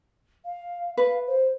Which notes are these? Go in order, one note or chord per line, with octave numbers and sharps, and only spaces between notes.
F5
B4 F5
C5